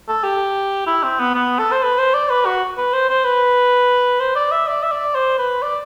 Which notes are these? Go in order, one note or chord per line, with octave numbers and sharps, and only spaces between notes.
A4
G4
E4
C4
B3
B3
A4
C5
B4
C5
D5
B4
F#4
B4
C5
C5
B4
C5
D5
E5
D5
E5
D5
C5
B4
D5